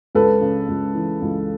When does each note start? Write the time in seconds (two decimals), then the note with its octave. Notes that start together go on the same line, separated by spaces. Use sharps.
0.15 C#2 A4 B4
0.41 C#3
0.69 C#2
0.94 E3
1.22 C#2